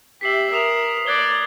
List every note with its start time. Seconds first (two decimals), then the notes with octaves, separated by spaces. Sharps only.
0.21 G4 E5 B6 C7 F#7
0.53 A#4 D#6 E7 F7
1.06 D5 F#6 G#6 G7